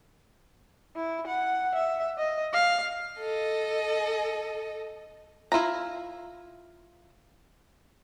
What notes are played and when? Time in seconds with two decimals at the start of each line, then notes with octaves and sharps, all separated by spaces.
0.96 E4
1.27 F#5
1.75 E5
2.18 D#5
2.53 F5
3.19 A4 D#5
5.52 E4 F4 E5 A#5